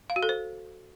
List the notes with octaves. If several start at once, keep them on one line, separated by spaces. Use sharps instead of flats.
F5
F#4
A4
C5